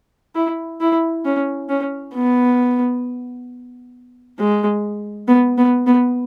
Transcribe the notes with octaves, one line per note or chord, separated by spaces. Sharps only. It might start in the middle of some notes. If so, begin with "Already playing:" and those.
E4
E4
C#4
C#4
B3
G#3
B3
B3
B3